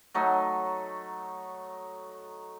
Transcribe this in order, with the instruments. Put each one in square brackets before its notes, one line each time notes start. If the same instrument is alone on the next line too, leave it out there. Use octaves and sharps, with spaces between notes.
[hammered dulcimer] F#3 A3 D#4